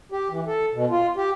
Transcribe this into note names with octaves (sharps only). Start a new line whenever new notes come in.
G4
E3
A4
B2
F4
G4